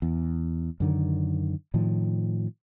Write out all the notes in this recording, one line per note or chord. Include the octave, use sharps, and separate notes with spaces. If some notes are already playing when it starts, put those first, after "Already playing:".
E2
F#2 D3 D#3
A2 D#3 F3